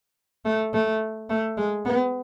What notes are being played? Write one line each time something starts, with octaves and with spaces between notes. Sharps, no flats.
A3
A3
A3
G#3
B3